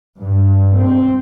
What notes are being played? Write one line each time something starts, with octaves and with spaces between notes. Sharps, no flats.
G2
C4